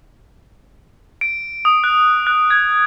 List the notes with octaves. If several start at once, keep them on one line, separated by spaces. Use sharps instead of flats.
D7
D#6
F#6
F#6
G#6